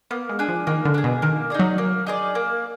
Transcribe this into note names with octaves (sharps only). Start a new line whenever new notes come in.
A#3 B3
G#3
D4 G#4
F3
D#3 A#3
D3
D4 G#4
B2
D#3 A#3
D#4 G#4 D5
F#3
A#3
D#4 G#4 D5
A#3